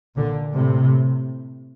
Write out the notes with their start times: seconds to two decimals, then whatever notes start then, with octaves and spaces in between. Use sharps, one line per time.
0.15 A#2 D3
0.53 A2 C3